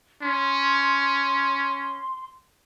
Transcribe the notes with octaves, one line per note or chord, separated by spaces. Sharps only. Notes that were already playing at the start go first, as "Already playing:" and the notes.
C#4 C6